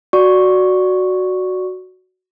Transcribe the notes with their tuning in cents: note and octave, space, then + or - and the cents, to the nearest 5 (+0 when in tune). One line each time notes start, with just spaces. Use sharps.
F#4 +0 D5 +0 C#6 +0